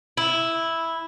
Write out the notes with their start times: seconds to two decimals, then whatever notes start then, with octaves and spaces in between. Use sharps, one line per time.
0.17 E4